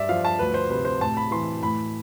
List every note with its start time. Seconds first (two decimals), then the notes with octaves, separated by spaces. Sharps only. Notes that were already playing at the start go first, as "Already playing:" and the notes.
Already playing: G2 D5 E5
0.09 F3 F5
0.25 A5
0.39 D2 B4
0.54 C5
0.70 C3 B4
0.85 C5
1.01 A2 A5
1.17 B5
1.31 E3 C6
1.63 A2 B5